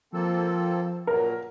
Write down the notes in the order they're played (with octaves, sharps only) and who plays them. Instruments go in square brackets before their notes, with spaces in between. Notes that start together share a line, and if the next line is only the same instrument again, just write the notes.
[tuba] F3 [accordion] A#3 C4 A4
[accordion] A#2 F#3 [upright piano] A#4